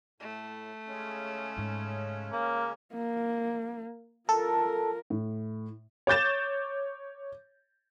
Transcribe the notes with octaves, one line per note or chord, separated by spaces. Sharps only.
A2 A3
C#3 G#3 C#4
G#2
A#3
A#3
F4 A4 A#4
A2
C#5 D6 G6 A6 E7